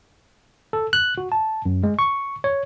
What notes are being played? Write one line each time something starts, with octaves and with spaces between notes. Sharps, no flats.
A4
F#6
F#4
A5
F#2
G#3
C#6
C#5